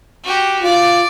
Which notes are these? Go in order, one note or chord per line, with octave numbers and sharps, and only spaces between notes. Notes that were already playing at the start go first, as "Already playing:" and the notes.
F#4 G4
F4 D5